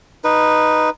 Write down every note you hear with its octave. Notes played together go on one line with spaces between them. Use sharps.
D#4 B4